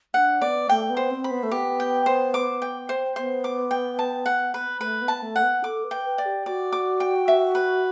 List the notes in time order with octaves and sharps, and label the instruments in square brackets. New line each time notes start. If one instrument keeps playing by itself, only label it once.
[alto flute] D4 [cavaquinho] F#5
[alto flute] B3 [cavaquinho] D5
[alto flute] A3 [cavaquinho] G5
[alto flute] B3
[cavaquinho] C5
[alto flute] C4
[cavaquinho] B5
[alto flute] B3
A3
[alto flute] B3 [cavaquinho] G4
[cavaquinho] G5
C5
D6
G5
C5
[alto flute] B3 [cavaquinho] C5
[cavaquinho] D6
G5
A5
F#5
B4
[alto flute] A3 [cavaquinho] B4
[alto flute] B3
[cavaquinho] A5
[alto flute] A3
[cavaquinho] F#5
[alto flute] B3
[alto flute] A4 [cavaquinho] D6
[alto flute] B4
[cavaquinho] G5
[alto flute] B4
[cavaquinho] D5
[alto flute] G4
[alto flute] F#4 [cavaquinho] D5
[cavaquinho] D6
G5
E5
B4